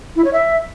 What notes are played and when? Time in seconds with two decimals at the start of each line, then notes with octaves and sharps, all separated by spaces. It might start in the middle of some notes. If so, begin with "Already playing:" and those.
0.16 E4
0.24 C#5
0.33 E5